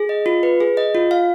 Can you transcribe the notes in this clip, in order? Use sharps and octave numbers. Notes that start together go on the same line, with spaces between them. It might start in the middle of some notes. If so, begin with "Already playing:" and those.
Already playing: G#4
D#5
F4
B4
G#4
D#5
F4
F5